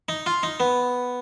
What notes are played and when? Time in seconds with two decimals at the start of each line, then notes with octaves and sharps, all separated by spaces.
0.09 D#4
0.26 F4
0.43 D#4
0.60 B3